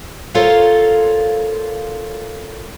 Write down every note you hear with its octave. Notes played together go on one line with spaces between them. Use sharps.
F4 A4 A#4 C5 C#5 F5